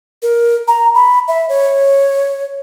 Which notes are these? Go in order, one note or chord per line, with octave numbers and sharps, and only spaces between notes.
A#4
A#5
B5
E5
C#5